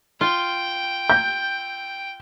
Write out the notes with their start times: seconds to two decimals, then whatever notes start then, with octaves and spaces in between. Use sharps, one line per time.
0.21 F4 G5
1.10 G6